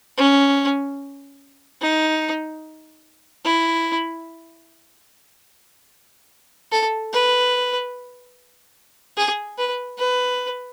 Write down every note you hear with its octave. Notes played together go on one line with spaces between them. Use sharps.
C#4
D#4
E4
A4
B4
G#4
B4
B4